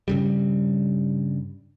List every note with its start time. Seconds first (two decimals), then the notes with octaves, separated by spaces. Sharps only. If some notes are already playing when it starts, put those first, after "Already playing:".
0.08 G2 C#3 G3